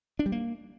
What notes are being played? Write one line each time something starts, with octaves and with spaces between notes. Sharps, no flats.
D4
G3
A#3